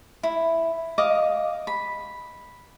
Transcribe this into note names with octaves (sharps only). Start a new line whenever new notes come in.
E4
D#5 F5 D6
B5